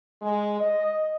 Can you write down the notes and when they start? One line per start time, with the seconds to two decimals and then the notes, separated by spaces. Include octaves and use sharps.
0.22 G#3
0.60 D#5